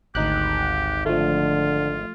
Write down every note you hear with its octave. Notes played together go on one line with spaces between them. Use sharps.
G#1 D2 D#4 G4 F#6
D3 F3 A3 F4